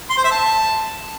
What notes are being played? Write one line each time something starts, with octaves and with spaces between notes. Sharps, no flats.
C6
C5
E5
A5